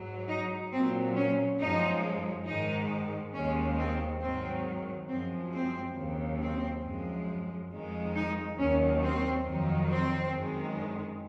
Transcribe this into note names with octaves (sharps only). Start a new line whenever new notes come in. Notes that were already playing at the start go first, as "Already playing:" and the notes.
Already playing: G#2 F#3
D#4
A#2 F#3 C4
C#4
F#2 F3 G#3 D#4
G#2 D#3 G#3 D#4
D#2 D#3 G#3 C#4
C4
G#2 D#3 F#3 C4
F#2 F3 G#3 C4
C4
D#2 C#3 F#3
C4
F#2 F3 G#3
F2 D#3 G#3
D#4
D#2 D#3 F#3 C#4
C4
F2 D#3 F#3
C4
F#2 D#3 G#3